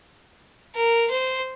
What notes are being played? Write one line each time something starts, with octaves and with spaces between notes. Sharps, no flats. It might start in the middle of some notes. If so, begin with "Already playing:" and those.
A#4
C5